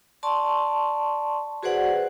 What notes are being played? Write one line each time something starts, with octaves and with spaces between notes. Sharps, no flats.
D5 A5 C6 C#6
F#4 G#4 B4 C5 D5 F#5